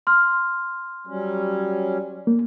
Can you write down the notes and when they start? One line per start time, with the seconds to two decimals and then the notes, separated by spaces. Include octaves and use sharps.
0.07 C6 F6
1.07 F#3 G3 C#4
2.27 A#3